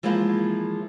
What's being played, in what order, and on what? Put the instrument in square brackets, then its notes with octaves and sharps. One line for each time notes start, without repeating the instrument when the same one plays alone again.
[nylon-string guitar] E3 F3 G#3 A#3 E4 F4